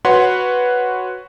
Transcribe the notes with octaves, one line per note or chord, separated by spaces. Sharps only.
F#4 B4 C#5 F#5 C6